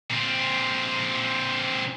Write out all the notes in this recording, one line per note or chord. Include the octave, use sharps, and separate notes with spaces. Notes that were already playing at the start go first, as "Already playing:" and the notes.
A#2 C4